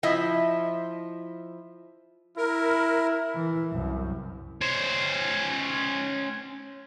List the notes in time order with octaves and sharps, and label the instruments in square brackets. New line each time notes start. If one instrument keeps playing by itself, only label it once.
[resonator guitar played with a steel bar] F3 E4 D#5 E5
[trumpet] E4 [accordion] A#4
[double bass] E3
C2 F#2
[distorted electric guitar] C#4 C5